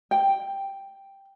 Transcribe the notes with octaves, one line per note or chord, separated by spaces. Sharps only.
G5